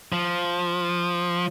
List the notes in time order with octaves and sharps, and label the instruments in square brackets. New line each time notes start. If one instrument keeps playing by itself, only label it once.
[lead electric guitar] F3